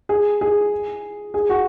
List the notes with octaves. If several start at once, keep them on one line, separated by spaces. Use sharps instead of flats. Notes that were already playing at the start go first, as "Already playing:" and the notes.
G#4
G#4
G#4
F#4